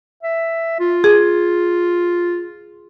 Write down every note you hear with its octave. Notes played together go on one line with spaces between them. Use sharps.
E5
F4
G#4